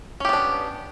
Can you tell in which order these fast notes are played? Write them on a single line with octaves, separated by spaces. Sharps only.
C#4 G4 B3 D4